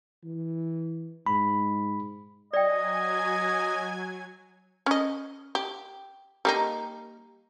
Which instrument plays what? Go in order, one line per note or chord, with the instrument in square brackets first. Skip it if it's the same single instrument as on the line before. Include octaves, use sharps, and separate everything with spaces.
[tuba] E3
[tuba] G#2 [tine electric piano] B5
[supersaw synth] F#3 G#5 G#6 [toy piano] D5 G5 [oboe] D#5
[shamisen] C#4 D#5
G4
G3 A#3 D#4